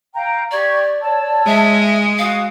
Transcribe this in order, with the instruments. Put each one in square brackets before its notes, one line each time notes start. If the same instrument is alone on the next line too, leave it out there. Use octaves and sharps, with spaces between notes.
[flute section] F5 G5 A#5
[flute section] G4 C#6 G#6 [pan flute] D5
[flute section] C#5 A5 E6
[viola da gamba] G#3 [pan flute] E5
[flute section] F#4 D#6 [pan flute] F5